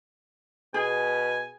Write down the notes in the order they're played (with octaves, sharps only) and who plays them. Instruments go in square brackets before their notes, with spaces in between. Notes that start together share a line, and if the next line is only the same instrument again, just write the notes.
[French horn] B2 [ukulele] G#4 [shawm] G#5